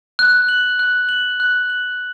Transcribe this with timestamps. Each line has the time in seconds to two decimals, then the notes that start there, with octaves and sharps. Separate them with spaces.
0.19 F#6
0.49 F#7
0.79 F#6
1.09 F#7
1.40 F#6
1.70 F#7